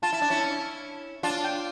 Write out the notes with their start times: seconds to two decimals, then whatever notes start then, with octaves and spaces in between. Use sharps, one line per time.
0.03 F4 A5
0.13 E4
0.22 D4
0.30 C#4 E4
1.23 D4 F4 A5
1.44 G5